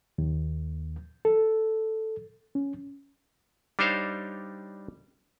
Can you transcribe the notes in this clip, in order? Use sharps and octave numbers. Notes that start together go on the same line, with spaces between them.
D#2
A4
C#4
G3 D4 D#4 C5 C#5 F5